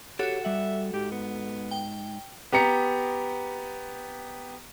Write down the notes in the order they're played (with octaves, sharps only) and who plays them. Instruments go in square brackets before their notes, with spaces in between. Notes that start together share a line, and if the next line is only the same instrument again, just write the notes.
[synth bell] F#4 A4 [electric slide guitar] G4 C#5 [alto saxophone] F#5
[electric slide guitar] G3 F#5 [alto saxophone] E5
[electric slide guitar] G#2 [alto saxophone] G4
[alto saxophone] B3
[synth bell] G5
[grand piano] B3 G4 A#5 C#7